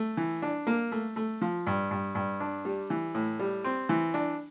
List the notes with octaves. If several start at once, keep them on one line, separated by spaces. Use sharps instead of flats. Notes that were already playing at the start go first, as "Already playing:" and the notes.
Already playing: A3
E3
D4
A#3
A3
A3
F3
G2
G2
G2
D4
G3
E3
A2
G3
C4
E3
D4